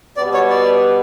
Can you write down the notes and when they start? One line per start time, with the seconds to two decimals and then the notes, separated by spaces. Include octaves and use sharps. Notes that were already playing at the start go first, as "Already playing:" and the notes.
0.17 B2 G3 B3 D5
0.34 C#5
0.50 D5